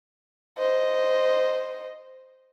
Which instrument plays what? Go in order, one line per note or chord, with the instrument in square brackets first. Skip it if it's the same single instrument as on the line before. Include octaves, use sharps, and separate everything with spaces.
[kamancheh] C5 D#5